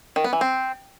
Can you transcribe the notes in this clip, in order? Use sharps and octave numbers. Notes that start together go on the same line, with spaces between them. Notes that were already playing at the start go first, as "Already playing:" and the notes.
D#3
B3
E3
C4